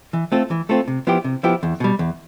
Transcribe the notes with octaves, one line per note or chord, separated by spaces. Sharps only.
E3
A3 C4 F4 A4
E3
A3 C4 F4 A4
C3
F3 B3 E4 G4
C3
F3 B3 E4 G4
E2
B2 G3
E2